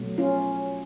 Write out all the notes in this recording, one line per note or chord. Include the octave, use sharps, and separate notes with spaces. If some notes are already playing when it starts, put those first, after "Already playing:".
Already playing: B2 F#3 A3
C#4 F4